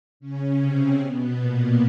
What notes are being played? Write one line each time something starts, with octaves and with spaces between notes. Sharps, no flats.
C#3 C#4
C3 C4
B2 B3
A#2 A#3